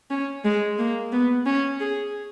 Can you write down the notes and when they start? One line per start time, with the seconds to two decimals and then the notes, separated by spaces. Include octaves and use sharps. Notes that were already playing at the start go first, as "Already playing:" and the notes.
0.11 C#4
0.45 G#3
0.79 A#3
1.12 B3
1.46 C#4
1.81 G#4